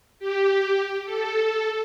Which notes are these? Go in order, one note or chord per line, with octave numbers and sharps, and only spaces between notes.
G4
A4